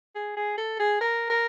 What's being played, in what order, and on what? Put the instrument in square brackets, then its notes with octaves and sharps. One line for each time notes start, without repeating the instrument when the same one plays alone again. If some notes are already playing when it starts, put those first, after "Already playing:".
[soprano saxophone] G#4
G#4
A4
G#4
A#4
A#4